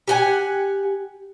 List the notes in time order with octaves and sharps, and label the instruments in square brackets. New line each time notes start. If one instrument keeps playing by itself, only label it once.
[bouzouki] G4 F#5 G#5